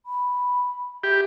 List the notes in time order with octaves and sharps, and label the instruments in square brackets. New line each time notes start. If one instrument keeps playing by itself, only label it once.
[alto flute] B5
[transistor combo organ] G4 [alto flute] E5